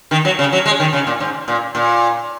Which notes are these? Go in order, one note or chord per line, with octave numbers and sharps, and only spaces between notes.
D#3
F#3
C#3
F#3
G#3
D#3
C#3
A#2
G#2
A#2
A#2